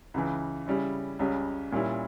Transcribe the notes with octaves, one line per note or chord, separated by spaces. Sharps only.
C#2 C#3 E3
C#3 G3 C#4 E4
C#2 C#3 G3 C#4
A#2 G3 C#4 E4